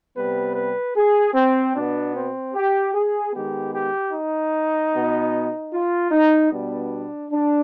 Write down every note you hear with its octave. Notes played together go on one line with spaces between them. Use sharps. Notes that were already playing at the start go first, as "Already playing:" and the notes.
C3 G3 B3 B4
B4
G#4
C4
B2 B3 D4
C4
G4
G#4
D#3 G#3 B3 G4
G4
D#4
B2 B3
F4
D#4
B2 G3 B3 D4
D4